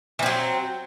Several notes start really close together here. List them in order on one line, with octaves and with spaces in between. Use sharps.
E3 C4 F#3